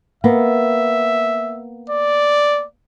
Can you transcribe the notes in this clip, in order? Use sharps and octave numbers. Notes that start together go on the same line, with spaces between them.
A#3 B3 E5
D5